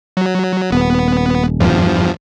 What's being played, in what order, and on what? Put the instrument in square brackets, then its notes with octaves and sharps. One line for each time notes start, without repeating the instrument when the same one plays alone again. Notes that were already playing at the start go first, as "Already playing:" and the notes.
[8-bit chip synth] F#3
[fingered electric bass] D#1 [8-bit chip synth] B3
[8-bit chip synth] E2 G2 F3